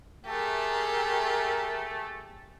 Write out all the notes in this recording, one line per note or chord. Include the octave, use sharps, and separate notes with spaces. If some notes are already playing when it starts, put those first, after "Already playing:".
A3 G4 G#4 A#4